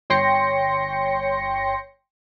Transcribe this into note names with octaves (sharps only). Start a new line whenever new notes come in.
G1 C#5 G5 C6 A#6 C#7